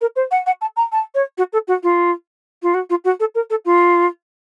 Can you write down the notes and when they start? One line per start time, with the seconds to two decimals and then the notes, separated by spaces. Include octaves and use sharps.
0.01 A#4
0.16 C5
0.31 F#5
0.46 F#5
0.61 A5
0.76 A#5
0.92 A5
1.14 C#5
1.38 F#4
1.53 A4
1.67 F#4
1.83 F4
2.62 F4
2.74 F#4
2.90 F4
3.04 F#4
3.20 A4
3.35 A#4
3.50 A4
3.65 F4